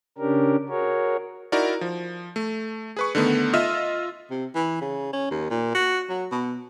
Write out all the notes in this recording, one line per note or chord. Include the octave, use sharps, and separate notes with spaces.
C#3 C#4 D4 G4 A#4
F#4 G#4 A#4 C#5
D#4 E4 F#4 A#4 D5
F3
A3
G#4 B4 C#6
D3 D#3 A3 B3
F4 D#5 E5 E6 F6
C3
E3
C#3
C#4
D#2
A#2
F#4
F#3
B2